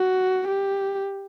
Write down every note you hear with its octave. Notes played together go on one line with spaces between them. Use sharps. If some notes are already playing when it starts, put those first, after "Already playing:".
Already playing: F#4
G4